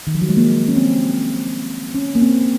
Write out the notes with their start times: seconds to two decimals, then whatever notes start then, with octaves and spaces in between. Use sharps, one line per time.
0.07 D#3
0.15 F3
0.22 F#3
0.29 G#3
0.37 A#3
0.68 C#4
0.76 C4
1.95 C#4
2.15 A#3
2.22 C4